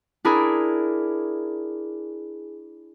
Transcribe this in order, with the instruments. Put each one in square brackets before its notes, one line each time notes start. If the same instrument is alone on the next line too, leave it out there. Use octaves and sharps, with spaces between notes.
[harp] D4 E4 G#4 A#4